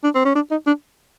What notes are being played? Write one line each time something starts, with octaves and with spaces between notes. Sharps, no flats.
D4
C4
C#4
D4
D#4
D4